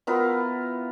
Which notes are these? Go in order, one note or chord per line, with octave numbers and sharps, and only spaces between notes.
B3 E4 F4 A#4